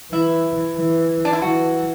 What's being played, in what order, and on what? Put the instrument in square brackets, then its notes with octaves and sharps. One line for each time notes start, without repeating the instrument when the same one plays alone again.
[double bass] E3 [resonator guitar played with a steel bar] E4
[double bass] E3
[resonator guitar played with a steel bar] D4
E4
[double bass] E3 [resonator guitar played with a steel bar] F#4